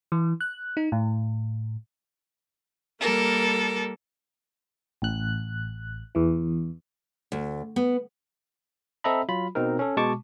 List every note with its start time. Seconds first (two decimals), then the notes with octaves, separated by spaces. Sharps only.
0.12 E3
0.41 F#6
0.77 D#4
0.92 A2
2.99 G3 A#3 A4 A#4
5.02 A1 F#6
6.15 E2 E3
7.32 D2
7.76 B3
9.04 C4 A4 D#5 E5 A#5 B5
9.29 F#3 F4 B5
9.55 B2 C4 D#4 A#4
9.79 C#4 A4
9.97 B2 G#3 A5 C#6 D6